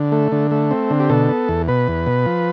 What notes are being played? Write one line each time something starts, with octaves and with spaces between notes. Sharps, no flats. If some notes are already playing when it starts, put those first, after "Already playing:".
Already playing: D3
A3
D3
A3
C4
D3
G4
B2 A4
B3
E2
B2 B4
E2
B2
F3